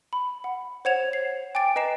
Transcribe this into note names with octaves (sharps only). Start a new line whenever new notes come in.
B5
F#5
C5 C#5 F#5 G#6 E7 F7
C7
G5 G#5 D6 A6 D7
B4 D#5 A#5 C7 E7